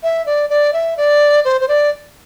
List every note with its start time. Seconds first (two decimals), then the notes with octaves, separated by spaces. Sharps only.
0.03 E5
0.26 D5
0.49 D5
0.73 E5
0.97 D5
1.45 C5
1.61 C5
1.68 D5